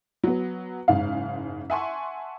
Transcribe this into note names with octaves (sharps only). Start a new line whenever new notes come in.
F#3 B3
F#1 G#2 F5
E5 F#5 G#5 A5 C6 C#6